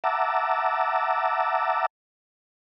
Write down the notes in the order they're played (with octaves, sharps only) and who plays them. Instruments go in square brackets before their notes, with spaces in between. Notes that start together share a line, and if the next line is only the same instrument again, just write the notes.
[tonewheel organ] E5 F#5 A5 A#5 D6 E6